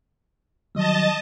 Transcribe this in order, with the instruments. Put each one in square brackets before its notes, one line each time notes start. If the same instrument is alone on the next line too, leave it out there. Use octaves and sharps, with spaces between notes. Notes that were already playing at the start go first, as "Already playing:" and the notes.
[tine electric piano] D#3 F#3 G3 [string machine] D#5 A5